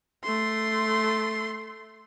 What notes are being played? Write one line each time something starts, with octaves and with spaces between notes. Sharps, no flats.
A3 C6